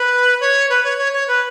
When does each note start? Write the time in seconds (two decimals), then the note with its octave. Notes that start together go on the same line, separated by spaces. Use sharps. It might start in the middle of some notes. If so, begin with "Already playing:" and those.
Already playing: B4
0.40 C#5
0.70 B4
0.84 C#5
0.98 C#5
1.13 C#5
1.28 B4